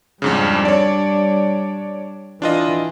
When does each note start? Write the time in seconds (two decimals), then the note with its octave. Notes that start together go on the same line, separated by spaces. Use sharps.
0.22 F2 G#2 C#3 G3 D4
0.65 C#5 D5
2.42 E3 D4 F4 D#5